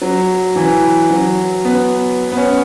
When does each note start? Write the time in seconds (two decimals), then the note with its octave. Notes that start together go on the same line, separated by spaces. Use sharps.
0.02 F#3
0.55 E3
1.10 F#3
1.65 B3
2.32 B3
2.37 C#4